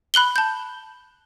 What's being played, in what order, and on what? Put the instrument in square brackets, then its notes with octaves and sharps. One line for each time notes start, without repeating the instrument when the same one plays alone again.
[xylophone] B5 F#6 F#7 G7
A5 G6